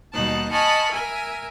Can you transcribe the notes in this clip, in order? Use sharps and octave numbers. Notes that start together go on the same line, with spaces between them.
D#2 B2 G3 D#4 A5 F#6
D#5 G#5 A5 B5 C#6 F6
A#4 E5 G#5